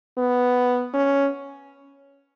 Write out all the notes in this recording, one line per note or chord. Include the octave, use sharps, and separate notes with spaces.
B3
C#4